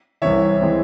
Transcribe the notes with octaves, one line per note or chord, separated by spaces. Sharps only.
C2 C3 E3 C#5 E5
E3 G#3 C4 E4